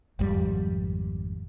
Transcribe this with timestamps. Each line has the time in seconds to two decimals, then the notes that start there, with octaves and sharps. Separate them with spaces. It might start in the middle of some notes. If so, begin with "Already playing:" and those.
0.19 G#1 F2 G3